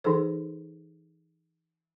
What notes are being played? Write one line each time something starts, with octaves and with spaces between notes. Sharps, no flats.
E3 D#4 G#4 A4 C5